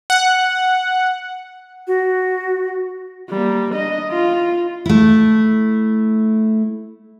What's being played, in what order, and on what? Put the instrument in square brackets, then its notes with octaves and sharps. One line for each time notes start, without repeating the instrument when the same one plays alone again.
[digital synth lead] F#5
[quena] F#4
[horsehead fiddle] G3 A#3
D4 D#5
F4
[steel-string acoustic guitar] A3 E4